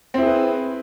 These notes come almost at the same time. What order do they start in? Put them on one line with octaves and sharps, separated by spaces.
C4 E4 G#4 B4